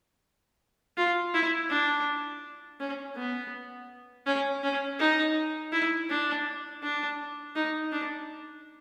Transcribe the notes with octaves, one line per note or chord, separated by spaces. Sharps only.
F4
E4
D4
C#4
B3
C#4
C#4
D#4
E4
D4
D4
D#4
D4